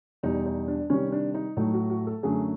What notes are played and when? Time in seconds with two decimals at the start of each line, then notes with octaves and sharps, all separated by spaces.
0.23 E2 B2 G3 D#4
0.46 D#4
0.68 D4
0.90 C3 D#3 G3 C#4
1.12 D4
1.34 D#4
1.57 A2 F#3 A3 D#4
1.73 F#4
1.90 F#4
2.07 A4
2.23 F#2 D3 F#3 A3 G#4